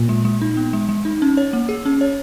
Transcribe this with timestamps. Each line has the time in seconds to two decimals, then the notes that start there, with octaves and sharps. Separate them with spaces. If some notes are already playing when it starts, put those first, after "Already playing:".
Already playing: A#2
0.09 G#3
0.25 G#3
0.41 D#4
0.57 B3
0.73 G#3
0.89 G#3
1.05 D#4
1.22 C#4
1.37 C#5
1.53 A#3
1.69 G#4
1.85 C#4
2.01 C#5